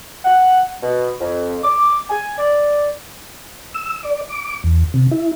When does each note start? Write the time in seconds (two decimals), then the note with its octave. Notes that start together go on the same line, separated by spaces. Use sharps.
0.25 F#5
0.83 B2
1.21 F2
1.64 D6
2.10 G#5
2.38 D5
3.74 E6
4.03 D5
4.29 D6
4.64 E2
4.94 C3
5.11 E4